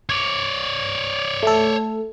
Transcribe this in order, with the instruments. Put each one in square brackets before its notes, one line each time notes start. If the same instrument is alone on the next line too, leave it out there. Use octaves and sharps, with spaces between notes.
[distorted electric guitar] C#5 D5
[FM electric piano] A3 A4